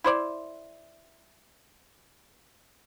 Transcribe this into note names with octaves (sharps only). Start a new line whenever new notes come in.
E4 C5 D5